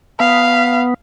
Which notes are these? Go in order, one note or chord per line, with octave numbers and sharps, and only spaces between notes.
B3 F5